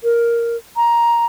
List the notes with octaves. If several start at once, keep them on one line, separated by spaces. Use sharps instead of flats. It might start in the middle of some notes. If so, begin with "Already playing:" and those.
A#4
A#5